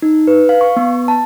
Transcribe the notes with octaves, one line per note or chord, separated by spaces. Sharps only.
D#4
B4
F5
C#6
B3
A5